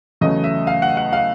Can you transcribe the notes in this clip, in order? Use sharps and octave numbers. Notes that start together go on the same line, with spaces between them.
E2 C#3 F#3 A3 D#5
E5
F5
F#5
F#5
F5